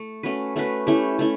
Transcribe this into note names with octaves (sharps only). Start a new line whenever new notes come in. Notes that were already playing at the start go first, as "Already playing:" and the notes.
Already playing: A3
A3 C#4 F#4 B4
A3 C#4 F#4 B4
A3 C#4 E4 G4
A3 C#4 E4